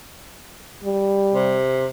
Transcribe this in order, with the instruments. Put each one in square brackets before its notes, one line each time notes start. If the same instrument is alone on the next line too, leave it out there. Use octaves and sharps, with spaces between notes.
[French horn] G3
[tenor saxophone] C3